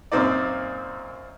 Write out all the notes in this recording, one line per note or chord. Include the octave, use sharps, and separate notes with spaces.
F#2 A#2 C4 D#4 D5